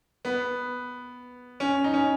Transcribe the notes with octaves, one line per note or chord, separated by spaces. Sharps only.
B3
C#4
D#4
C#4